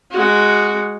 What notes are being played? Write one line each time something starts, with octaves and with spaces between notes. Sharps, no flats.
G#3 F#4